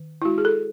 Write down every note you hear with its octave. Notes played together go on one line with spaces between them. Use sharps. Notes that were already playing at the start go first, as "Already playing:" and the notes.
Already playing: D#3
E4
G#3 F#4
G#4
A4